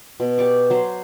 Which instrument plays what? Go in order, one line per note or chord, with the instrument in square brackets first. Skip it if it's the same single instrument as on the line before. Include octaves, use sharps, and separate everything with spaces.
[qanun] B2
G4 D5 C#6 D6
F#3 C5